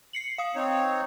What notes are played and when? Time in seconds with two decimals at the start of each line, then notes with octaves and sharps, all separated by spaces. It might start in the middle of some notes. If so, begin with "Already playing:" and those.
0.13 C7 C#7 F#7
0.38 F5 D#6
0.55 C4 D#4 C#5